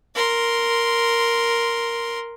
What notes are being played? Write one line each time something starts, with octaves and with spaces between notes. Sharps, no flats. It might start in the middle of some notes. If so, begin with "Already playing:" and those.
A#4 C6